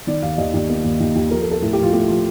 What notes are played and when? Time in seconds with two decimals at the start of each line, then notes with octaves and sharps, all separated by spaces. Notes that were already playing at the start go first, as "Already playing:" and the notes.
0.07 D#3 D5
0.22 D#2 F5
0.38 D#2 D#5
0.53 D#2 D5
0.69 A#3
0.84 D#2
1.00 D#2
1.16 D#2
1.31 F3 A#4
1.41 A4
1.46 F3
1.51 A4
1.62 A2 A4
1.73 G4
1.78 F3 F4
1.93 A3 G4
2.08 F3 F4